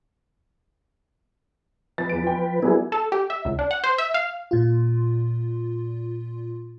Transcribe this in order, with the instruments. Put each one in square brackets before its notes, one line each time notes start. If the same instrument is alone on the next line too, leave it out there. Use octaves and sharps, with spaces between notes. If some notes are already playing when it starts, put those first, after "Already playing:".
[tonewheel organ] F3 B4 [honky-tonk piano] A6
[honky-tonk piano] E2 D7
F4 G5
[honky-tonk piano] F#3 G3 A#3 [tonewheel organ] B3 E4 G#4
[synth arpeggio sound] A4
G4
E5
C#2
D4
F#5
C5
E5
F5
[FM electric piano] A#2 F4